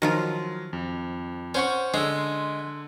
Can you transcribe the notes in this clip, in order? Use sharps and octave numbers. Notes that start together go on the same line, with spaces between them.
D#3 F3 F#3 F4 F6
F2
C#4 C5 F#5 C#6
D3 G#3 C6 E6